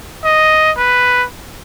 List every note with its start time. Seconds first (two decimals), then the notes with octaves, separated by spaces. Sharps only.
0.25 D#5
0.78 B4